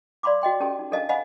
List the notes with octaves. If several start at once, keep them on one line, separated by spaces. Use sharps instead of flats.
D5 F5 B5 C6 D6
F#4 D#5 G5 C6
C#4 G4 A4 G5 A5 B5
D#4
D4 A4 A#4 D#5 F5 A5
C5 D#5 F5 F#5 G#5 B5